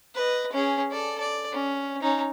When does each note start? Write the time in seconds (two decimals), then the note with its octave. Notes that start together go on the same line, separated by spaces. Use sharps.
0.15 B4 D#5
0.53 C#4 G#4
0.91 A4 D5
1.20 D5
1.52 C#4
2.02 C#4 D#4